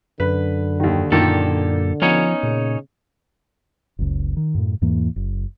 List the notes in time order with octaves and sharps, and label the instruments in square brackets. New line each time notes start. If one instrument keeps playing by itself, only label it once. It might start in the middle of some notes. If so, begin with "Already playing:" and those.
[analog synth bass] F#2 [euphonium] D3 [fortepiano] B4
[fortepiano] D#2 D#3
[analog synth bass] F#2 [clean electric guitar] A#2 G4 A4 [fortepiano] D#3 A#3 F4
[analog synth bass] F3 [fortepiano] B3 [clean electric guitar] C#4 D#4 C#5
[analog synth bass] A#2 [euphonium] C#3
[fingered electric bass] F#1 C#2
D#3
F#2 A2
E2 G#2 E3 A#3
F#1